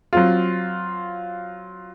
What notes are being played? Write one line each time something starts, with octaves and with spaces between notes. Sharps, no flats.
F#3 C4 F4